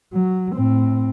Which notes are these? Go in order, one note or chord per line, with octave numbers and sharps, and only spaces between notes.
F#3
A2 C4